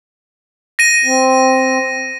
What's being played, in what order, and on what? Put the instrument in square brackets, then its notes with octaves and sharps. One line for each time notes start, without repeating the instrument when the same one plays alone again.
[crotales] A#6 D#7
[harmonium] C4